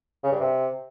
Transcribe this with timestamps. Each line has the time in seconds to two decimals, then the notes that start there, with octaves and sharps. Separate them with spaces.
0.23 C#3
0.32 G2
0.41 C3